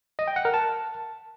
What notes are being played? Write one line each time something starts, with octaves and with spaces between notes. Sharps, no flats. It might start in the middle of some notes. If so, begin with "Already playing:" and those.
D#5
G5
F#5
A#4
A5